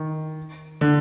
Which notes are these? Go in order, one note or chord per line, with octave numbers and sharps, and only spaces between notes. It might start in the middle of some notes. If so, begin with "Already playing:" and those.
Already playing: D#3
D3